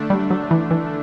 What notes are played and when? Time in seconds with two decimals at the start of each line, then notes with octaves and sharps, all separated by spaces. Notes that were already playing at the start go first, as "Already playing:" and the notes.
Already playing: D3 A3 D4
0.10 G3
0.30 F#3
0.51 E3
0.71 E3